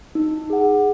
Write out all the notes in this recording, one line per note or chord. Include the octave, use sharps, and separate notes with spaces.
D#4
G#4 F#5